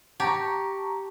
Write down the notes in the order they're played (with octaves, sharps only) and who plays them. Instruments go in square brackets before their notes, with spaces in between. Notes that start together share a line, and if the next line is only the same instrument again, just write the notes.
[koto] G4 [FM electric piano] A5 A#5 C#6